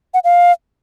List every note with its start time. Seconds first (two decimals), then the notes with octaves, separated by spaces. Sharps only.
0.14 F#5
0.24 F5